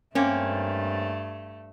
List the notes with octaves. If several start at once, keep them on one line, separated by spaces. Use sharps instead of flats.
G2 A3 A#3 C4 C#4